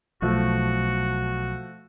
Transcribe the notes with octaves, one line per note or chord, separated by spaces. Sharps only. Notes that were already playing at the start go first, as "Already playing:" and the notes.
B1 F3 A3 F#4